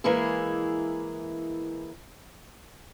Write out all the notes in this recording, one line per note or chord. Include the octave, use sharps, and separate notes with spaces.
E3 G#3 A#3 E4 G#4